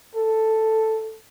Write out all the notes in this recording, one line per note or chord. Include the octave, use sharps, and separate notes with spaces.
A4